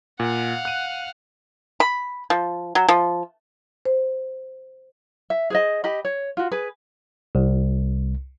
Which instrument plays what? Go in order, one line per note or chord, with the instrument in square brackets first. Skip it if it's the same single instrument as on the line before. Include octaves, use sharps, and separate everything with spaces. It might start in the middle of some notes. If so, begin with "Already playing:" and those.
[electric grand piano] A#2 [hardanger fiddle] F5 F#5
[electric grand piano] F#6 D#7
[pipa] B5
F3
F#3
F3
[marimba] C5
[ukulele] E5
G#4 C5 D#5
G4 D#5 B5
C#5
F4 F#4
G#4 B4
[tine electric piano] C2